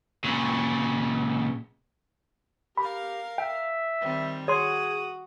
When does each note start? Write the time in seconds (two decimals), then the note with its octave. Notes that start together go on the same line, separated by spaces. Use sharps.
0.24 A#2 C#3
2.77 G4 A#4 F5 B5
3.38 E5 G5
4.01 D#3 G3 C4
4.48 F#4 G#4 C#5 C6 D#6